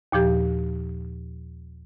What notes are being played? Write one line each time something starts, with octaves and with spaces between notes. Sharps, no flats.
D#2 A#2 F3 G4